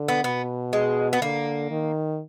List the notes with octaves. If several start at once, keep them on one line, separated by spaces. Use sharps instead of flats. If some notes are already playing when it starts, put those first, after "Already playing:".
Already playing: D3
B3
B2 B3
G#3
B3
D3 A#3
D#3